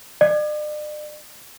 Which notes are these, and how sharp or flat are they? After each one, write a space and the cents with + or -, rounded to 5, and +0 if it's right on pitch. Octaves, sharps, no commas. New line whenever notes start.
D5 +40